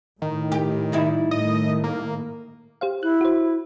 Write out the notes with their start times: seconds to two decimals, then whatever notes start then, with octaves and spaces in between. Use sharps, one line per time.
0.22 A2 D#3
0.52 G4
0.92 G3 D#4 E4
1.31 A2 D#3 A3 D#5
1.84 A#3
2.81 G4 C5 F5
3.03 E4 F#6
3.21 F#4 C5